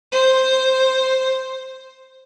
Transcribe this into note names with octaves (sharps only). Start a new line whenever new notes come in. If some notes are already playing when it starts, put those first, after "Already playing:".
C5